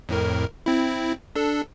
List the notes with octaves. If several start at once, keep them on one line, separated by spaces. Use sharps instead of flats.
F2 A2 A#4
C4 E4
D4 A4